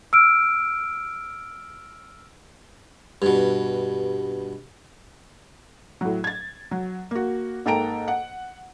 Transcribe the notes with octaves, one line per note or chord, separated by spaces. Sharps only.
E6 F6 D7
G2 B2
A2 F#3
G#6 A6
F#3
A#3 F#4
G#2 A#3 A4 G5 A#5 D7
F#5